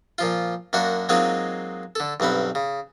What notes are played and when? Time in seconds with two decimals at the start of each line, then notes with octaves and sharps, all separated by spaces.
0.18 A#2 F3 F4
0.73 F#2 A#3 D4 F#4 F#5
1.09 F#3 G#3 A#3 C4 D#4 F4
1.95 D3 A4
2.20 B1 G2 C4 F#5 B5
2.55 C#3